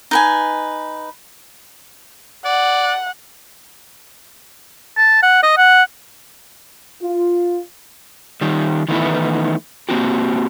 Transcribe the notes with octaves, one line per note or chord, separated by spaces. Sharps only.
D#4 B4 G#5
D5 F#5
A5
F#5
D#5
F#5
F4
D#3 G3
D#3 E3 A3 B3 D#4 E4
A#3 C4 F#4 G4